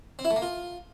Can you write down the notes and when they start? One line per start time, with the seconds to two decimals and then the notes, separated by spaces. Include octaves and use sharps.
0.19 C4
0.25 E4
0.30 A3
0.36 A#3
0.42 F4